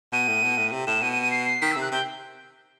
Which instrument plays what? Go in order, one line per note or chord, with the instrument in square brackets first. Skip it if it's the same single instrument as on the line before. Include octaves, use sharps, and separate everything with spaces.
[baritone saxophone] B2 [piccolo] D#7
[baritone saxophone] A2
B2
A2
C3
[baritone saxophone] A2 [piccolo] E7
[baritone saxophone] B2 [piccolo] D#7
[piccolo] D#7
D#7
C7
C7
[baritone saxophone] D#3 [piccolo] B6
[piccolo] E6
[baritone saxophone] C3
[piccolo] F#6
[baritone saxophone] C3 [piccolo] G5